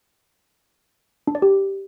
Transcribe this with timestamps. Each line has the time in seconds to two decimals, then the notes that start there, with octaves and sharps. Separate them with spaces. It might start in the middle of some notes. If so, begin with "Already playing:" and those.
1.27 D4
1.35 D5
1.42 G4